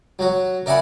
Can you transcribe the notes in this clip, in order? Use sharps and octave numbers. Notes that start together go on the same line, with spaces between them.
F#3 F#4
A#4 D5 E5 F#5 G#5 B5